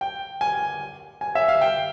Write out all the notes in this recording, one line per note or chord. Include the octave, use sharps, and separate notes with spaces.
G5
G#5
G#5
E5
F5
G5